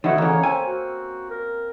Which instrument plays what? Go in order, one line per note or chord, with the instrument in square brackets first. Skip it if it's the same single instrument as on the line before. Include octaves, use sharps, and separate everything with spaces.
[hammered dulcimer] B2 A3 B3 [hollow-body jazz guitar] D#3 E4 [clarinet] C#5
[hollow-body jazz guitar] E2 C#3 [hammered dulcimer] A#3 C#4
[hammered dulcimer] C4 [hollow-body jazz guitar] G#5
[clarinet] F#4
A#4